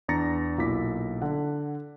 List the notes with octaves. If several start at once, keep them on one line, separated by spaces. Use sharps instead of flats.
E2 D4 A#5 A6 A#6 C#7
B1 A#2 E4 D6 B6
D3 F#5